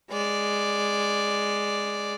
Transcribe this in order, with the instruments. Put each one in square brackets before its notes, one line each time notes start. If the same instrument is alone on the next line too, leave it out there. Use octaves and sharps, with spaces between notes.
[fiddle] G#3 D5